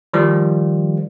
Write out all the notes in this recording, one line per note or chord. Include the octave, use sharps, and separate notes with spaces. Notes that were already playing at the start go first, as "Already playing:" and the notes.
D#3 F3 G3